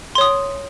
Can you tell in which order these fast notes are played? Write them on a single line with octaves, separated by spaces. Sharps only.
C6 C#5 D#6